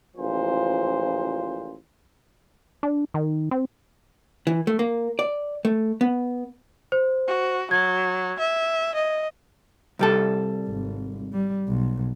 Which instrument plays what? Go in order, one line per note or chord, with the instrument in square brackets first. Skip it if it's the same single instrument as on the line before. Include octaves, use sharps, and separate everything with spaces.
[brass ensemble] A1 A#2 C#3 F3 C5
[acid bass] D4
D#3
C4
[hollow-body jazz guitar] E3
A3
A#3
D5
A3
B3
[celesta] C5
[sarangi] F#4
[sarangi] F#3 [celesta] G#6
[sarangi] E5
D#5
[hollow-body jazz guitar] C2 G3 A4
[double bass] G#1
G3
B1